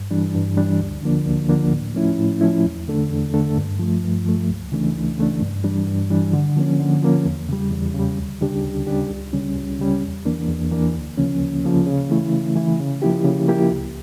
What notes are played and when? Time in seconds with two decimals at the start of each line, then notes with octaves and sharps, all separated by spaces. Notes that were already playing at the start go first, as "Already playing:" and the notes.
Already playing: G2
0.11 E3 G3 D4
0.34 G2
0.57 E3 G3 D4
0.80 D2
1.03 D3 F3 A#3 D4
1.26 D2
1.49 D3 F3 A#3 D4
1.72 A2
1.95 F3 A3 C#4 E4
2.18 A2
2.41 F3 A3 C#4 E4
2.65 E2
2.88 D3 A3 D4 A4
3.11 E2
3.34 D3 A3 D4 A4
3.57 G2
3.79 F3 A3
4.03 G2
4.26 F3 A3
4.49 C#2
4.72 C#3 E3 A3 D4
4.95 C#2
5.18 C#3 E3 A3 D4
5.41 G2
5.64 E3 G3 D4
5.87 G2
6.10 E3 G3 D4
6.33 D3
6.56 F3 A#3 C#4
6.79 D3
7.02 F3 A#3 C#4
7.25 E2
7.49 C#3 G3
7.71 E2
7.94 C#3 G3
8.18 D2
8.41 C#3 G3 D4 G4
8.63 D2
8.87 C#3 G3 D4 G4
9.10 C#2
9.33 C#3 G3 C#4
9.57 C#2
9.79 C#3 G3 C#4
10.03 E2
10.25 E3 A#3 D4
10.48 E2
10.71 E3 A#3 D4
10.95 D2
11.17 C#3 F3 A#3 C#4
11.40 D2
11.64 C#3 F3 A#3 C#4
11.86 C#3
12.10 E3 A3 E4
12.33 C#3
12.55 E3 A3 E4
12.79 C#3
13.02 F3 A#3 E4 G4
13.25 C#3
13.48 F3 A#3 E4 G4
13.71 C#2